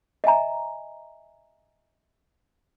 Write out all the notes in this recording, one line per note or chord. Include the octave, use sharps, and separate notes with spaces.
D#5 E5 G#5 A#5